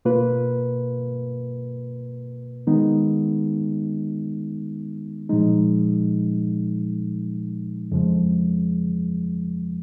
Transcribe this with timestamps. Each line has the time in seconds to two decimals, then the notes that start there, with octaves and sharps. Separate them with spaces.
0.05 B2 A#3 F4 B4
2.67 D#3 G#3 B3 D#4
5.29 A#2 F3 G#3 D#4
7.92 F2 C#3 F3 G#3